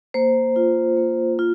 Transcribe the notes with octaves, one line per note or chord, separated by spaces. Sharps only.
A#3 C5
F4
A#3
F4